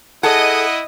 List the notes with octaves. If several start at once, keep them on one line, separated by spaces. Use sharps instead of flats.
E4 G#4 A4 D#5 F#5 D#6